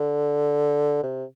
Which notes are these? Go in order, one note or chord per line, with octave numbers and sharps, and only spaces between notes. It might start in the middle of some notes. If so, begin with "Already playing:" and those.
Already playing: D3
C3